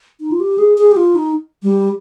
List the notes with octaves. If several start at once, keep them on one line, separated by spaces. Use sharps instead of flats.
D#4
F4
G4
G#4
G#4
G4
F4
D#4
G3